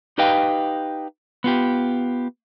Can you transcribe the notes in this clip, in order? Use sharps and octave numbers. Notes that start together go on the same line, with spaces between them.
D#4 G4 B4 D#5 F5 G5
B3 F4 G4